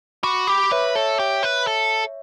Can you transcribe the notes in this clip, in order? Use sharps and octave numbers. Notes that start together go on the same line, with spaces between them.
F#4 B5 D6
G4 B5 D6
B4 C#5 E5
A4 C#5 E5
G4
B4
A4